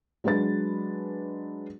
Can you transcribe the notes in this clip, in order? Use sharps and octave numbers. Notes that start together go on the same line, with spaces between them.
F#3 G#3 D4 B4 A6